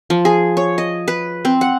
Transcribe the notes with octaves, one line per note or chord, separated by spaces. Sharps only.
F3
G#4
C#5
D#5
B4
C4
F#5